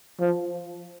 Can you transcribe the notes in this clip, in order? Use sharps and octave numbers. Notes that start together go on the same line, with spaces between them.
F3